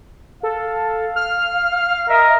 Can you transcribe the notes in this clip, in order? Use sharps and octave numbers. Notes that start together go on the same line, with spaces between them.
A4 F5
F6
A#4 D#5 E5